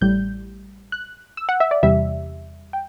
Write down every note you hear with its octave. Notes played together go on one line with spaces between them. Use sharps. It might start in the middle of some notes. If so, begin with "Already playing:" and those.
A1 A2 G3 G6
F#6
E6
F#5
E5
D5
E2 C3 G3 E5
G5